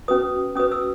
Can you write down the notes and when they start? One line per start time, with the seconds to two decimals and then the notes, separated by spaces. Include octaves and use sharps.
0.08 C#4 F#4 B4 D#6
0.55 C#4 F#4 B4 D#6
0.72 E6